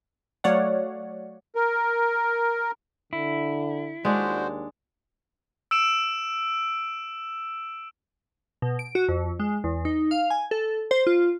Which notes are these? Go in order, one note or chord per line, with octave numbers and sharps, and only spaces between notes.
F#3 A3 C#5 D5 F5 F#5
A#4
D3 E4
D#2 G#3 D4 F#4 C5
E6 D7 E7
B2
D7
F#4
F2
G#3
E2
D#4
F5
G#5
A4
C5
F4